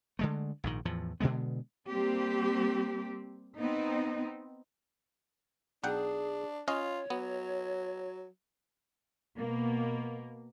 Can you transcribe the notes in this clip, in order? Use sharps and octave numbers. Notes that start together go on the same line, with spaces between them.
D3 G#3 A3
A#1 G#2 D#3
E2 A2 F3
B2 D3 G#3 B3
G3 A#3 C4 G4
B3 C4 D#4
B1 D4 G#4 F#5 G5
C#4 F4 C#5 D#5 F5
F#3 B3
B2 A#3